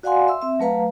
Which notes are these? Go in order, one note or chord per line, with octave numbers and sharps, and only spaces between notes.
F#4 D5 F5 F#5 G#5 C6
E5 C6 E6
C4 E5
F#3 A3 B4 F5 A#5